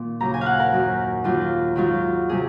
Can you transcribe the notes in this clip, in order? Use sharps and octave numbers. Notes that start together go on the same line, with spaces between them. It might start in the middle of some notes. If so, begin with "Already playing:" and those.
Already playing: A#2 D#3
D#2 C#3 F#3 A#5
G#5
F5 F#5
A#4
F#2 D#3 F#3
D#2 D#3 F#3 F4
G#2 D#3 F#3 F4
C3 F#3 G#4